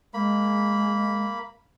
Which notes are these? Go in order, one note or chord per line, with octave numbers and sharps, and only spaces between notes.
G#3 A#3 B5